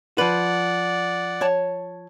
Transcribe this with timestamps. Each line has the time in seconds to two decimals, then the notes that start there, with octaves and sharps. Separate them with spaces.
0.18 F3 B4 D5 F#5
1.41 C#5 A5